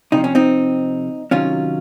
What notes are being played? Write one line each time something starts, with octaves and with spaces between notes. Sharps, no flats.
C3 F3 D#4
C#4
C4 D#4
C3 D#3 F#3 C#4 F4